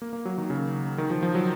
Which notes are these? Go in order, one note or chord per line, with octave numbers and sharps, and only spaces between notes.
A#3
A#3
F#3
D#3
C#3
D#3
F3
F3
F#3